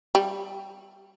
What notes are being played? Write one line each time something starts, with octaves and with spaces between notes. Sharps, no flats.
G3